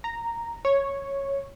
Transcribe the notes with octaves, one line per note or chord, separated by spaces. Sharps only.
A#5
C#5